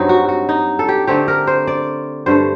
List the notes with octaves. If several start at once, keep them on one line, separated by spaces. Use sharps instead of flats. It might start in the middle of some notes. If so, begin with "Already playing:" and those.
Already playing: G2 F#3 C4 D#4
F#4
F#4
D#4
A4
G4
D3 A3 C4 G4
A#4
C5
D5
G2 D3 A3 C5